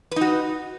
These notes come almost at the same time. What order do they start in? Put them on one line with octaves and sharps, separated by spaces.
B4 D#4 F#4